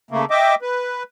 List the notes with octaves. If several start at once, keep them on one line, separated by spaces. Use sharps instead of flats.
C#3 A3 A#3
D#5 E5 G5 D6
B4